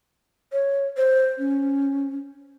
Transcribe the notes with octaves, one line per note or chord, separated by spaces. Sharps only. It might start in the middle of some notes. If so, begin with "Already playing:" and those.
C#5
C5
C#4